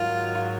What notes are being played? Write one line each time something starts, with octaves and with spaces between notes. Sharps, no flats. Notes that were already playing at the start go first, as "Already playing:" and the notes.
Already playing: G#2 D#3 F#3 F4